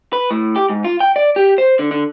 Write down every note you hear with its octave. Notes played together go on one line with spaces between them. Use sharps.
B4
A2
G4
G#2
F4
G5
D5
G4
C5
D3
D3